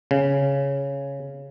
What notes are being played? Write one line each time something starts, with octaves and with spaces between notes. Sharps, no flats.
C#3